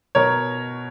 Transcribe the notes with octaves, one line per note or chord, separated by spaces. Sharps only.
B2 A#4 C#5